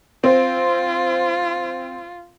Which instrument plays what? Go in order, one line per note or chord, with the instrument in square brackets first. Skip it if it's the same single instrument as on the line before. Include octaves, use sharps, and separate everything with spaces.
[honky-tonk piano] C4 [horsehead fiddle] F4